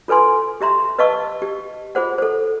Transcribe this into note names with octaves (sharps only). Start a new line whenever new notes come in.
F4 A4 B4 G#5 C6
G4 E5 A#5 C6
B4 D#5 F5 A5 C#6 E6
G4
F4 G#4 C5 F#5
A4 C5